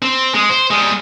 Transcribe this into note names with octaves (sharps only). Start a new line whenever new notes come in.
C4
G#3
C5
G3 G#3